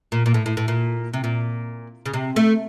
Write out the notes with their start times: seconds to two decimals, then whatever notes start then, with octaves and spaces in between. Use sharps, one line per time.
0.12 A#2
0.26 A#2
0.34 A2
0.46 A2
0.57 A2
0.68 A#2
1.13 C3
1.24 A#2
2.06 C#3
2.14 C3
2.36 A3